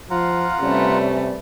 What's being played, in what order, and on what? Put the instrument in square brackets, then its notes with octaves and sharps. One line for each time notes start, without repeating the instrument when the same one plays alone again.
[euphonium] F3 [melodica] F4 F#5 A#5 [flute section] F5 F6
[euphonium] C3 [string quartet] G3 A3 B4 [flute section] C#4 D5